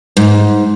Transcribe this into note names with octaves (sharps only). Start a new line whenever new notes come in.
G#2